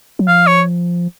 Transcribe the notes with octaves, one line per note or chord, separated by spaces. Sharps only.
F#3
F3 F5
C#5